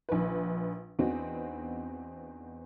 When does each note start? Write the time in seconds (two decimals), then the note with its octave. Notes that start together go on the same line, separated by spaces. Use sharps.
0.09 A#1 D#3 B4
0.99 E2 B3 C4 D4 D#4 F#4